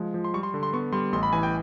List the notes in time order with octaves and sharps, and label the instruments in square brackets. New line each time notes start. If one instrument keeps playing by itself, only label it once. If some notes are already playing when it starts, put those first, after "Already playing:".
Already playing: [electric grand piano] F3 G#3
F3
C6
G3 C#6
C6
D3
C6
B3 C#6
G3 C6
A1 C6
B5
E3 G#5
G5